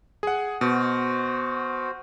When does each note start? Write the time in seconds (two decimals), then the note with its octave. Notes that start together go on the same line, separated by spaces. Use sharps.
0.23 G#4 F#5
0.61 B2 F#4 C5